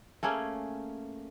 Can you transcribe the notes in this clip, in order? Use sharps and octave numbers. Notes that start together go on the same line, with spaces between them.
A3 A#3 C#4 G#4